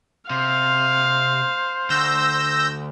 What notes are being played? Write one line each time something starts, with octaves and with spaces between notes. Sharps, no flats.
C3 C5 F5
D2 E6 G6 A#6